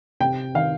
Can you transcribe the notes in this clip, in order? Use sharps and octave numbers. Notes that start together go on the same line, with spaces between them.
C3 G5
D#3 F5